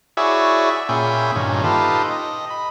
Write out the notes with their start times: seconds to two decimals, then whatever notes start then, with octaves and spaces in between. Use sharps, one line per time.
0.17 E4 F#4 G#4 C#5 D5 E5
0.89 A#2 C#4 G#4 E5 G5 B5
1.36 G2 A#2 D#3 C#4
1.63 D#4 F4 G4 A4 B4
2.11 D#5
2.50 B5